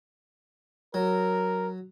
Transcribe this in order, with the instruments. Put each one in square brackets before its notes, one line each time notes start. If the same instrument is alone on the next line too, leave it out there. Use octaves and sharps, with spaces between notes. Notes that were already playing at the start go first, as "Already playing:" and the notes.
[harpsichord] F#3 [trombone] A#4